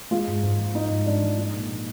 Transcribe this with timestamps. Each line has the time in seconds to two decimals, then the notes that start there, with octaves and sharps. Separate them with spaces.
0.11 G#3 F4
0.27 G#2
0.43 G#2
0.58 F3
0.75 G#3 D#4
0.90 G#2
1.06 G#2 D4
1.22 F3
1.37 G#3 D#4
1.53 A#2
1.70 A#2